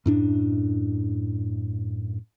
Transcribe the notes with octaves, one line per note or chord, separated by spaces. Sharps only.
F#2 A2 D4